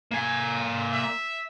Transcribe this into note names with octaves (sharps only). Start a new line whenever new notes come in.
A#3 G#5
E5